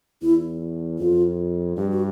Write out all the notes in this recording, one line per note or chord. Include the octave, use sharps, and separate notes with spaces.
E2 E4
F2 F4
G2 G4
F#4